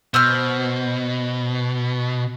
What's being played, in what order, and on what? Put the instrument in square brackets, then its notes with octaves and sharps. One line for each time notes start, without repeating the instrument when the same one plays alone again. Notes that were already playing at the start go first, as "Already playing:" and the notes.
[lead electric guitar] B2 [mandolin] C5 E6 F6